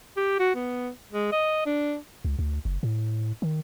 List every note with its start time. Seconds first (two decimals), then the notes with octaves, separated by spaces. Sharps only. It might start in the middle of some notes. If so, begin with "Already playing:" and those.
0.17 G4
0.39 F#4
0.55 B3
1.12 G#3
1.32 D#5
1.66 D4
2.25 C#2
2.39 D2
2.65 F#1
2.83 A2
3.42 D#3